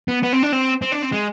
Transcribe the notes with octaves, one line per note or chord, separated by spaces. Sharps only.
B3
B3
C4
D4
C4
C4
D4
C4
G#3